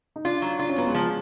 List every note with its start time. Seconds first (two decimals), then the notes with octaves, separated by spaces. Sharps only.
0.16 D#4
0.25 D4 F4
0.42 F#3
0.59 D4 F4
0.69 C#4
0.77 F#3 B3
0.86 G#3
0.95 F3